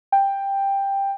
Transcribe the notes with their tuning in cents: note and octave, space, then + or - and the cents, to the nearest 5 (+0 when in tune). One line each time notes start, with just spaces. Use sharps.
G5 +10